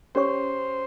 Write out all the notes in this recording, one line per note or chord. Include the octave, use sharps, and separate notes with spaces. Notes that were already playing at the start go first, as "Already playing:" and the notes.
C#4 G4 C5 C#5 G5 C#6